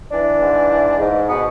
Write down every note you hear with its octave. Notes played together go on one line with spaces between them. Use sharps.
E3 D4
G#2
E3
G#2
B2 B3